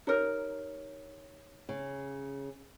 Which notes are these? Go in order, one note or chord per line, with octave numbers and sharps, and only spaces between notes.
D#4 G4 A#4 C#5
C#3